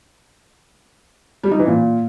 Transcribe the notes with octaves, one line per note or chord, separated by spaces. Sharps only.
G3
D#4
E3
A#2